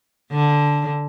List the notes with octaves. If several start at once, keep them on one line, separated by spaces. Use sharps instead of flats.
D3